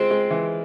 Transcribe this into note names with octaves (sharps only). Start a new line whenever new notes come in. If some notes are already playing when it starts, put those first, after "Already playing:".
Already playing: G#3 C4 F4
G#3
E3